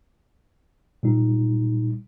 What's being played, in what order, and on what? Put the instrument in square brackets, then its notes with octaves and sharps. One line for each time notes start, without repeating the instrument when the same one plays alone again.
[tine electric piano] A#2 G3 D#4